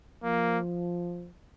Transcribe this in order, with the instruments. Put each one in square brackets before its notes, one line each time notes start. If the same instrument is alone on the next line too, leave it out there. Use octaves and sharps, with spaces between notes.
[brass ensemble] F3 [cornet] A#3